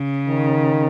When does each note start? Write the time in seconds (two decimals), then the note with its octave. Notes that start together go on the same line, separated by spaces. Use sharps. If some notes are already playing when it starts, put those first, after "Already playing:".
Already playing: C#3
0.29 D#3